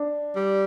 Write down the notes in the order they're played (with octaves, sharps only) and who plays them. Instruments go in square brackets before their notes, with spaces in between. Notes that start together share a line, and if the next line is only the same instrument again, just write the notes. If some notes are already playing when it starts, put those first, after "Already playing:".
Already playing: [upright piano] D4
[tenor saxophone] G3